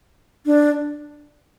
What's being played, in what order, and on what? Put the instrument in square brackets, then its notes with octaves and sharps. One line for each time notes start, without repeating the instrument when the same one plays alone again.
[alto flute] D4